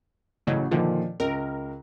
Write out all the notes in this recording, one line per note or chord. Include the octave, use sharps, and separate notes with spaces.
A1 A2 C#3 F#3
A#2 D3 D#3 F3
C#2 A#4